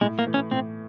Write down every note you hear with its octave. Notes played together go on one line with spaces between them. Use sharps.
A2 G#3
A#3
E3 A3
C#4
A2 C4